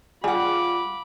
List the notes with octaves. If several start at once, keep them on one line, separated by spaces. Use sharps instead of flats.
G3 F4 G#4 F#5 B5 D6